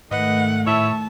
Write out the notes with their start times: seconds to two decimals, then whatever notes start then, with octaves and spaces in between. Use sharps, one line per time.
0.11 G#2 D#3 A3 B4 D#5 F#5
0.67 A2 E4 C#5 E5 A5